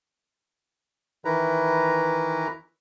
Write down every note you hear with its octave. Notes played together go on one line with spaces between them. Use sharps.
D#3 E3 E4 B4 A#5